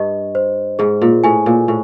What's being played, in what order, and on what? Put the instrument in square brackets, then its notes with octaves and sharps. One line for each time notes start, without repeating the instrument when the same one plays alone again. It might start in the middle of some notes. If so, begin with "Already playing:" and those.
Already playing: [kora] G2 [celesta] D#5
[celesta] C5
[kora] G#2 [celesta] G#4
[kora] A#2
[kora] A2 [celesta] G#5
[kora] A#2
A2